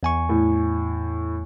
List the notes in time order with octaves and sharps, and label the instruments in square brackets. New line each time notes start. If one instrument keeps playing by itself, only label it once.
[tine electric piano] E2 G#5 C#6
[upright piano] A2